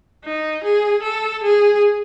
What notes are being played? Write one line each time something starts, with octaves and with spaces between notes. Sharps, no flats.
D#4
G#4
A4
G#4